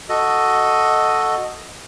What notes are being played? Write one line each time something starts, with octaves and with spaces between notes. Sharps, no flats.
F#4 A4 D#5